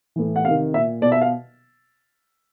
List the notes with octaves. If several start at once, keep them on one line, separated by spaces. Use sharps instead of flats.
A2 E3
F#5
C3 D#3 F5
A#2 E5
B2 D5
E5
F5